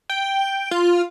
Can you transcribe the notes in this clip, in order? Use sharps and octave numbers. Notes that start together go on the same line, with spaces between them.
G5
F4